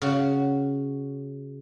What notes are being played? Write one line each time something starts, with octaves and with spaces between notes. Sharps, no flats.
C#3 F#4